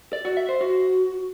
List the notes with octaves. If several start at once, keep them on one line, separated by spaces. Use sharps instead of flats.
D5
F#4
E5
C5
F#4